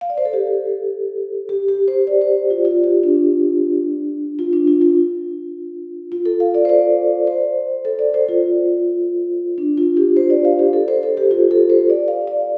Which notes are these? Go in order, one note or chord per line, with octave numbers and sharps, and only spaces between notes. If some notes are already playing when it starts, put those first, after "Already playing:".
F5
D5
C5
A4
G4
G4
G4
C5
D5
C5
F4
F4
G4
D4
F4
D4
F4
F4
F4
A4
F5
D5
C5
D5
C5
A4
D5
C5
F4
D4
F4
G4
C5
D5
F5
G4
A4
C5
A4
G4
F4
A4
C5
D5
F5
D5